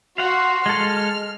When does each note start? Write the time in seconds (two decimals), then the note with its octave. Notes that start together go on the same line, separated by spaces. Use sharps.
0.18 F#4 F5 F#5 C6
0.66 G#3 A4 F6